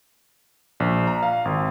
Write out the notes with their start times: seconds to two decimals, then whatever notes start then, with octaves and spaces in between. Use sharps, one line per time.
0.80 A#1
1.07 A#5
1.23 F5
1.45 G#1